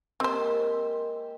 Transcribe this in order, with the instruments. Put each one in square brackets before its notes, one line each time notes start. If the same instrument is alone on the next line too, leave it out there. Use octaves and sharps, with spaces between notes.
[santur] G#3 A#3 G4 [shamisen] C4 C5